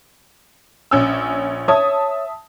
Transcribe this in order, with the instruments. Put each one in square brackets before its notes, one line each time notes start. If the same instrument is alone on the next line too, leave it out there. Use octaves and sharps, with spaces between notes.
[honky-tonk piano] A#1 C#4 E6
[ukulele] C#5 [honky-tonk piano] E5 A5 D#6